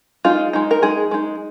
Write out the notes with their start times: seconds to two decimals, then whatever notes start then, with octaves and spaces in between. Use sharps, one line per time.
0.25 G#3 D#4 F4
0.53 G#3 D#4
0.71 A#4
0.82 G#3 D#4 G#4
1.11 G#3 D#4